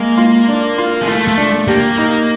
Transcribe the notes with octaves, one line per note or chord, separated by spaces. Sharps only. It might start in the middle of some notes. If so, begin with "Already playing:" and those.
Already playing: G#3 A#3
F4
D4
F4
G#3
A3 F4
A3
D4
A#3 G4
D#4